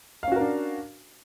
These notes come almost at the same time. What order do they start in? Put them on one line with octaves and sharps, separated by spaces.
F5 C#4 F#4 A#4 D4